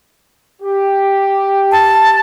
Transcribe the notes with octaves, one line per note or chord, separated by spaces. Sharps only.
G4
A5